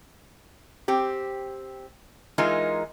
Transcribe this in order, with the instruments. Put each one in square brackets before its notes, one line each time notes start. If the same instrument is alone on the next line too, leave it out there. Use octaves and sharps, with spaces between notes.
[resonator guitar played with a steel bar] C4 G4
E3 G#3 D#4 F4 A#4